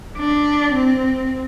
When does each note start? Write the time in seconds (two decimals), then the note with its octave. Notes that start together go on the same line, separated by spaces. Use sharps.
0.17 D4
0.73 C4